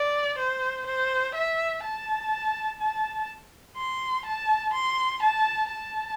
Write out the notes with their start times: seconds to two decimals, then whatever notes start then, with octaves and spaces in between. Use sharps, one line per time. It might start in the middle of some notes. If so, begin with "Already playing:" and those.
Already playing: D5
0.38 C5
0.86 C5
1.35 E5
1.83 A5
2.80 A5
3.77 C6
4.25 A5
4.73 C6
5.22 A5
5.70 A5